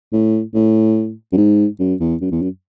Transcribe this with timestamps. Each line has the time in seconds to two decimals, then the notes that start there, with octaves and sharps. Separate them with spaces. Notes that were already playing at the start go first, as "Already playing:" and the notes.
0.13 A2
0.55 A2
1.32 F#2
1.37 G#2
1.80 F#2
2.00 E2
2.21 F#2
2.31 E2
2.42 F#2